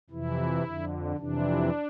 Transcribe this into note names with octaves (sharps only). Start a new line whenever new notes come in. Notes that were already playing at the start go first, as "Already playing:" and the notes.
F2 C3 E3 E4
F2 D3
F2 C3 E3 D4